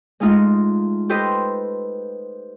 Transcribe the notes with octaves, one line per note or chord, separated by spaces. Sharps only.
G#3 A3 D#4 F4 D#5
G4 A4 B4 C5 D#5